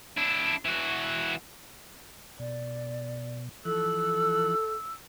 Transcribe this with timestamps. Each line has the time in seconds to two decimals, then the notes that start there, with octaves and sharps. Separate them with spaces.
0.17 D4 E4
0.65 E3 F#4
2.39 B2 D5
3.65 E3 F3 A4 E6 F#6